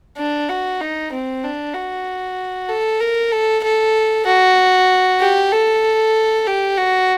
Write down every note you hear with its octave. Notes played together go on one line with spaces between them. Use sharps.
D4
F#4
D#4
C4
D4
F#4
A4
A#4
A4
A4
F#4
G4
A4
G4
F#4